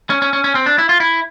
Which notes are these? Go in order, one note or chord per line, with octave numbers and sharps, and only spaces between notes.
C#4
C#4
C#4
C#4
C4
D4
E4
F4
E4